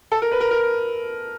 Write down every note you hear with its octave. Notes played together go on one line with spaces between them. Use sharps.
A4
A#4
B4
A#4
A#4